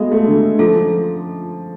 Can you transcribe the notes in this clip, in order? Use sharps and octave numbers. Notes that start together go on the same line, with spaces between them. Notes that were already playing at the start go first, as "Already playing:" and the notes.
Already playing: G#3 B3 F#4 A4 F5
A3
D3
F3 C#4 F4 A4